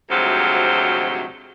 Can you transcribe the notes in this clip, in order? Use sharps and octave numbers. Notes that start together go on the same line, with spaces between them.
D2 G#2 C3 F3 F#3